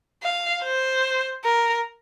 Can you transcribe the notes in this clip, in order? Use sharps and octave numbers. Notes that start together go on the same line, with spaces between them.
F5
C5
A#4